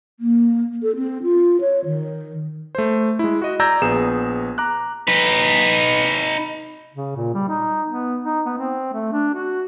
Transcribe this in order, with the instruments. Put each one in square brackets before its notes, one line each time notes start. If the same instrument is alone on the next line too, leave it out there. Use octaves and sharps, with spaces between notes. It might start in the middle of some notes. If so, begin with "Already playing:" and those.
[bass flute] A#3
A4
C4
F4
C#5
D#3
[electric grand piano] A3 C5
G#3 E4
F#4 D#5
D5 A#5 E6 G6 G#6 A#6
A#1 B3 G#4 E7
A#5 D6 F#6
[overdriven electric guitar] D#4 B4
[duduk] C#3
A#2
G3
D#4
B3
D#4
B3
C4
A3
D4
F#4